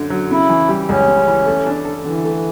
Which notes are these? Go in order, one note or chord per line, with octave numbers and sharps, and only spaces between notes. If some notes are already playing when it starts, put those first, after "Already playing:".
Already playing: F#2 D3
F#3
C#3 E4
E3
G3
C#2 C#4
C#3
E3
A3
D4
A4
D3 E3
A3